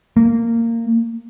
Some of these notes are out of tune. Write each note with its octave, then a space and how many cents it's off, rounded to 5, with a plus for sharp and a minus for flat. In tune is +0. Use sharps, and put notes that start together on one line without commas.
A#3 -20